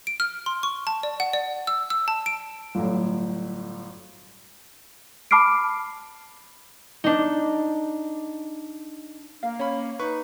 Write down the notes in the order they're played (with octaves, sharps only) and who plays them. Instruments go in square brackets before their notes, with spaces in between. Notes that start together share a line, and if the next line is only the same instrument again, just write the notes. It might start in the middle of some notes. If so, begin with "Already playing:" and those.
[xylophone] D7
F6
C6
C#6
A5
D5
F#5
D5
E6
E6
A5
D7
[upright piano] G1 A2 F#3
[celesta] A5 B5 D6 F6 C7 D7
[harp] D4 D#4
[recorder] A#3 [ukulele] F5
[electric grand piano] C#4 B5 [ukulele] C#5
[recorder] D#4 [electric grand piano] B4 C#6